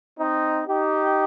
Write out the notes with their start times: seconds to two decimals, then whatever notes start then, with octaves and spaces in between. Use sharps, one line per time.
0.19 C4 D#4
0.68 D#4 G4